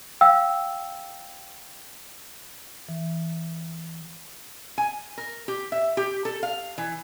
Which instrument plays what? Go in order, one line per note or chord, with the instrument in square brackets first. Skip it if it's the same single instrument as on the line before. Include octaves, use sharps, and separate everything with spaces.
[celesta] F5 G5 E6
[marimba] E3
[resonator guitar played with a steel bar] G#5
A#4
G4
E5
G4
A4
F5
E3